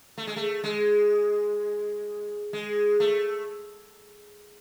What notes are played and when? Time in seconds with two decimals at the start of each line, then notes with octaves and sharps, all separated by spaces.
0.18 A3
0.27 G#3
0.36 A3
0.64 G#3
2.53 G#3
3.00 A3